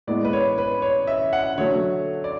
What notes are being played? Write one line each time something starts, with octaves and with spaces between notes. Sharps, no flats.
A2 G#3 B3 D5
B4
C#5
B4
C#5
E5
F#5
D3 F#3 A3 C#5
D5